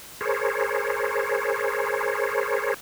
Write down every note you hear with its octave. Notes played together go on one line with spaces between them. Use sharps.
G#4 A#4 C5 C#5